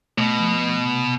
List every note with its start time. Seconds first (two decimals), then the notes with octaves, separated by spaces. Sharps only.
0.17 B2 A3
0.40 F3
0.63 A3
0.85 C3